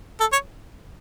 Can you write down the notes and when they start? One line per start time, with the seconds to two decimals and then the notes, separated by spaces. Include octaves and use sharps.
0.20 A4
0.32 C#5